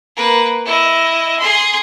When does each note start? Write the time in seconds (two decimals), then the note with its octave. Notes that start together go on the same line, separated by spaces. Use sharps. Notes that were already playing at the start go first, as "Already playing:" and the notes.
0.16 A#3 B4
0.65 E4 D#5
1.39 G#4 C6